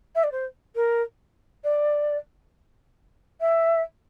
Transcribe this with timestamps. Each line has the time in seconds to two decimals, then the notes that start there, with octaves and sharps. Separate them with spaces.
0.15 E5
0.23 D5
0.31 C5
0.75 A#4
1.64 D5
3.40 E5